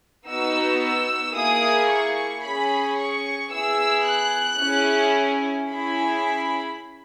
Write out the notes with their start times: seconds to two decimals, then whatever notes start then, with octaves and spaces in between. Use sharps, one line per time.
0.27 B3 D#4 F#4 E6
0.81 E6
1.35 A#3 E4 G#4 D#6
1.90 C#6
2.43 C#4 G#4 B5
2.98 C#6
3.52 B3 E4 G#4 E6
4.06 F#6
4.60 C#4 E4 G#4
5.69 C#4 E4 G#4 B5